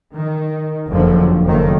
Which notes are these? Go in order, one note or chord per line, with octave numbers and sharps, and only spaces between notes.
D#3
F#1 F2 D3 F3
F#1 D#3 A3 A#3